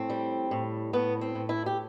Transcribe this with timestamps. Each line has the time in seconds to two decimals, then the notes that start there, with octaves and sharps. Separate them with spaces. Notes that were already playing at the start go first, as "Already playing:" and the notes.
Already playing: A2 C4
0.10 G3
0.51 A2
0.93 A2 B3
1.21 C4
1.35 A2
1.49 E4
1.66 G4